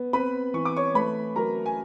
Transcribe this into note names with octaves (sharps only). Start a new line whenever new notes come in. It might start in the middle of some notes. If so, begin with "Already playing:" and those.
Already playing: B3
C4 B4 B5
E3 C#6
D6
C#5 C#6
A3 B4 B5
F#3 A#4 A#5
G#5